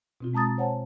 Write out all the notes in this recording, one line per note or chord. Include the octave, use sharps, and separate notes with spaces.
B2 C4 F4
G#3 A5 A#5 D#6 A6
C5 C#5 F#5 G#5 A5